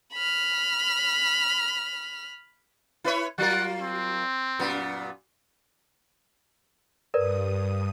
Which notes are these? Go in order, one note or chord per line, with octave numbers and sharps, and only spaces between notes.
B5 F6
E4 B4 C#5
F#3 F4 A#4 F#5
C4
F#2 A#2 B3
G2 A#4 B4 D5 D#6